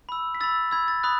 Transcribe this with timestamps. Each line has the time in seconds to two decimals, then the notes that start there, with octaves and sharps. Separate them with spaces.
0.09 B5 E6
0.35 B6
0.40 B5 E6 A6
0.71 B5 E6 G#6
0.88 A6
1.03 B5 D#6 F#6